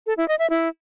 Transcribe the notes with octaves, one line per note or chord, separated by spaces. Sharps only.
A4
E4
D#5
E5
E4